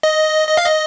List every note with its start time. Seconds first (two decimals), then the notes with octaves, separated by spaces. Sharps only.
0.03 D#5
0.49 D#5
0.57 F5
0.66 D#5